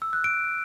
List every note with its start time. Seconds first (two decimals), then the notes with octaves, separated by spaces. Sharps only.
0.02 E6
0.13 F#6
0.24 D7